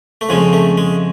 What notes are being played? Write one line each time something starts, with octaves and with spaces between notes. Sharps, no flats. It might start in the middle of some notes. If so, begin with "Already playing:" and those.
A3
F2 C#3 F3 G#3
A3
G#3